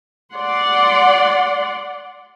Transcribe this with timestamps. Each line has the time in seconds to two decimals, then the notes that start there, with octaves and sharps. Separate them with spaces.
0.33 D5 F#5 C6